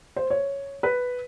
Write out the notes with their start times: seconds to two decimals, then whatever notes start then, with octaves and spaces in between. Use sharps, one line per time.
0.16 C5
0.30 C#5
0.83 B4